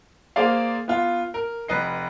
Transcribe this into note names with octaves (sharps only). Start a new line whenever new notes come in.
A#3 G#4 C5 D5 F5
B3 F4
A#4
F1 B4 D#5 C7